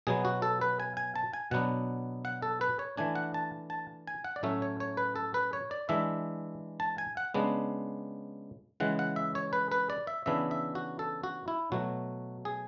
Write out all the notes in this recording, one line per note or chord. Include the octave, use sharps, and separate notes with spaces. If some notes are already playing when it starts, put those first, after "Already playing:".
B2 F#3 B3 G#4
F#4
A4
B4
G#5
G#5
A5
G#5
B2 F#3 B3 D4 F#5
F#5
A4
B4
C#5
E3 A3 D4 G#5
F#5
A5
A5
G#5
F#5
D5
A2 F#3 A3 C#4 E5
C#5
C#5
B4
A4
B4
C#5
D5
E3 G#3 D4 E5
A5
G#5
F#5
C#3 G#3 B3 D4
C#3 E3 G#3 F#5
F#5
E5
C#5
B4
B4
D5
E5
C#3 E3 B3 D4 E5
E5
F#4
A4
F#4
E4
B2 F#3 A3 F#4
G#4